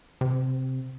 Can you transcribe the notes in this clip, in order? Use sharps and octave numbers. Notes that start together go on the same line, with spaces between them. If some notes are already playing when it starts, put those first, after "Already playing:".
C3